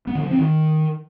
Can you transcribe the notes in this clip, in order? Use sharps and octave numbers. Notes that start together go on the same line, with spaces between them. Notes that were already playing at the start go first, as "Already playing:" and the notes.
B3
D3
F3
C4
D#3